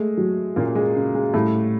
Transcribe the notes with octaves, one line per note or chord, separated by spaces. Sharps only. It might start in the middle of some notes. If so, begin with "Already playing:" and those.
Already playing: G#3 A3
F#3
A#2 A#3 C#4
G#3
C#3
G#3
A2 G3 A3